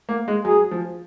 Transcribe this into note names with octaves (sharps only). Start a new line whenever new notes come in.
A#3
G#3
F#3 G#4
F3